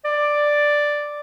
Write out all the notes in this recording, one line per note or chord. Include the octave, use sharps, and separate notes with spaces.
D5